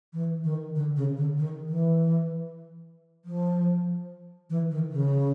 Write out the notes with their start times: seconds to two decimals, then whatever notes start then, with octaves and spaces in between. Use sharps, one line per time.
0.13 E3
0.44 D#3
0.75 D3
0.96 C#3
1.17 D3
1.38 D#3
1.69 E3
3.25 F3
4.50 E3
4.71 D#3
4.92 C#3